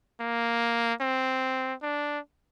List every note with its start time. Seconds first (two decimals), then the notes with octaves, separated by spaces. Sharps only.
0.20 A#3
1.01 C4
1.82 D4